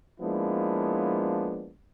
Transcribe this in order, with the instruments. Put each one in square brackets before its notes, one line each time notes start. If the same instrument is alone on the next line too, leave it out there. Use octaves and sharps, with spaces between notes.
[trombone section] F3 G#3 A#3 B3 D4 E4